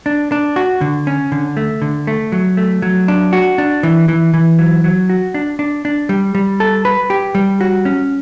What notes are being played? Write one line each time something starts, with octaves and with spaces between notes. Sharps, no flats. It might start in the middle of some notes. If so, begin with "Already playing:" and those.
D4
D4
F#4
D3
C#4
D3
A3
D3
A3
F#3
A3
F#3
D4
F#4
D4
E3
E3
E3
F#3
F#3
F#4
D4
D4
D4
G3
G3
A4
B4
G4
G3
F#4
C#4